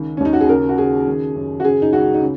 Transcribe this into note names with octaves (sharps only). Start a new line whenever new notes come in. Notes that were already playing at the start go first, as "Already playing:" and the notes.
Already playing: C#2 D#3
C#4
D#2 D#4
F#4
G#4
C#3 A#4
F#4
C#3 G#4
D#3
F#2
F#4
C#3 G#4
D#4
C#2 F#4
D#4
C#3